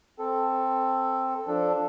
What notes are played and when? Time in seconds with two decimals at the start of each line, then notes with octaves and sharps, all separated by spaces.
0.19 C4 A4
1.47 F3 D4 A4